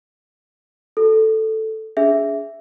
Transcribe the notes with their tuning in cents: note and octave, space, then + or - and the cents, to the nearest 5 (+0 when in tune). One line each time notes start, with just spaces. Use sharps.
F#4 -20 A4 +0
D4 -45 G#4 +5 E5 +0